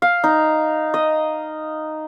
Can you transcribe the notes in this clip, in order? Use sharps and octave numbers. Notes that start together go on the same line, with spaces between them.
F5
D#4
D#5